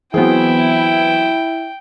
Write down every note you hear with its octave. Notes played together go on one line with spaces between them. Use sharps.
E3 F#3 B3 C4 E4 G#4 G5